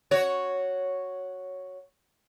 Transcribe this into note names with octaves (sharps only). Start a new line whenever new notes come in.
F#4 C#5